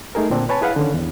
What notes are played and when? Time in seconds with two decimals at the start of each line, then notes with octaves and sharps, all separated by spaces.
0.15 A3 D#4 G#4 A#4
0.30 A#2 D3 C4 D4
0.49 B4 C#5 G#5 A5 B5
0.61 E4 G#4 B4 F5 F#5
0.76 D3 D#3 C#4
0.94 E2